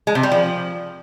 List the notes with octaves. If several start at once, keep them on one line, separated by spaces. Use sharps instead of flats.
G#3
C3
G3
F3